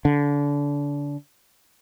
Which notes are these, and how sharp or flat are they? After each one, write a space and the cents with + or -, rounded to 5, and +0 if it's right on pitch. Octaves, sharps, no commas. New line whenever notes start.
D3 -30